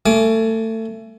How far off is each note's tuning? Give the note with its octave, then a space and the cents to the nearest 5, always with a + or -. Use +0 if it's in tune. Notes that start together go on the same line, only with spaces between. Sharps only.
A3 +25 G#5 +35 D6 +0